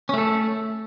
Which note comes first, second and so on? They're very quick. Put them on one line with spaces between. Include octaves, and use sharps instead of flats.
C#4 A3 A4